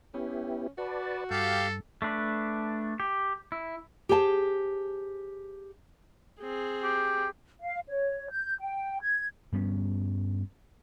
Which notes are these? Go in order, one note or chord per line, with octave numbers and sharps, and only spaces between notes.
B3 C#4 E4 G4
F#4 B4 D5 A5
G2 G4 A4 F5 G6
A3 D4 B4
G4
E4
G4 G#4 C5 G#5 A5
C4 G#4
G4
F5
C#5
G6
G5
G#6
G2 G3 B3 C#4